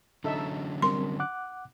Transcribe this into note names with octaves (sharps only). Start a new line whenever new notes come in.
D3 F#3 C#4 D#4 A4 E5
G3 C4 A#4 C6
F#5 D6 F#6